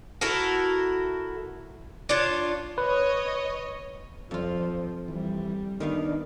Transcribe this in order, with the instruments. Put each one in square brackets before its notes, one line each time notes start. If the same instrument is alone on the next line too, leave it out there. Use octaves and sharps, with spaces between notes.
[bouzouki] E4 F#4 A4 A#4
D4 F4 C#5
[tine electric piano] B4 [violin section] C#5 D#5
[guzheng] F2 F4 [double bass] F3
[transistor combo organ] E3 [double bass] G3
[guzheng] D#3 B3 F5 [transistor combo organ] D4 D#4